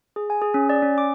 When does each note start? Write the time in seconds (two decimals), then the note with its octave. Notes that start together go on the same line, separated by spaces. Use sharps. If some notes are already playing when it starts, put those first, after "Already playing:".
0.16 G#4
0.30 G#5
0.42 G#4
0.54 C#4
0.69 D5
0.82 C#4
0.98 D6